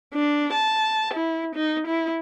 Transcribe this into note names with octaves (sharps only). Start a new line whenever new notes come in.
D4
A5
E4
D#4
E4